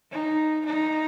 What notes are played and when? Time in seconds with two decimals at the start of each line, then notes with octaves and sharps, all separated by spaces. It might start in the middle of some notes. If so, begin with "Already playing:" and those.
0.11 D#4
0.65 D#4